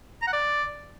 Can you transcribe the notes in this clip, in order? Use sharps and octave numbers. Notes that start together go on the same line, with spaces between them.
A#5
F#5
D5